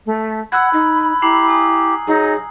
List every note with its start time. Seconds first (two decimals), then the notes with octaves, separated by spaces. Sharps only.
0.06 A3
0.52 F#5 B5 E6 F#6 G#6
0.73 D#4
1.22 E4 G4 A#5 C7 F#7
1.48 G#5 D#6
2.07 F#3 D#4 G#4